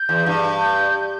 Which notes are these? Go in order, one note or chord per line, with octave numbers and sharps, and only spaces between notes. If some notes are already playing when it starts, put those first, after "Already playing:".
Already playing: G6
E2
G2
G6